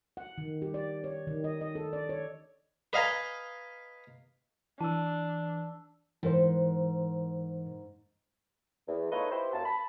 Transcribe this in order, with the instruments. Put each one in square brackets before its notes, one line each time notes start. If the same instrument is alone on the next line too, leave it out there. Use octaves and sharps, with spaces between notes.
[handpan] F#5
D#3
G4
D5
C#5
D#3
D#5
D#5
A4
D5
C#5
[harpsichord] B4 D#5 F5 G#5 A#5
[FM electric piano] E3 [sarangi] D4 [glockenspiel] A5 E6
[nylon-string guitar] G#2 [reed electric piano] E3 A#4 C5
[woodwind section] E2
A3 D#4 F4 B4 C#5 D#5
E4 G4 B4 C5
F#2 A#3 F#4 A5
A5 B5